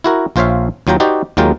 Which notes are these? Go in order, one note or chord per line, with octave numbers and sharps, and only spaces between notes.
E4 F#4 A#4
A#1 F4 C5 C#5 E5 F5
D#2 F#3 F4 G5 A#5
D#4 F#4 G4 C5 D5
D#2 F#3 G#3 F4 A#4 G5